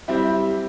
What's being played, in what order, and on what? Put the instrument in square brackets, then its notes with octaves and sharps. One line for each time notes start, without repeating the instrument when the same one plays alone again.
[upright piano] G3 C4 E4 G4